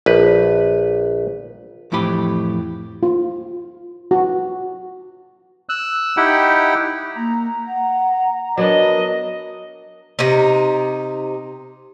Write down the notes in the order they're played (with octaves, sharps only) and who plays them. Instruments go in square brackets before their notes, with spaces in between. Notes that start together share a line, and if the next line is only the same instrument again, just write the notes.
[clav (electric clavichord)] A#1 B4
[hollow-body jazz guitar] F2 A2 E3 G4 B5
[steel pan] F4
F#4
[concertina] E6 F#6
D#4 E4 G4 F#5 G5
[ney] A#3 [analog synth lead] A#5
[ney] F#5
[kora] F#3 B3 D4 [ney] A#4 [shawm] D#5
[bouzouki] C3 D#4